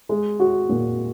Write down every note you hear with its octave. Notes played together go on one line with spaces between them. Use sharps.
G#3
F#4
A#2